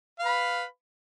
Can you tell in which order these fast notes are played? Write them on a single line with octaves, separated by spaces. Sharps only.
F5 B4 B5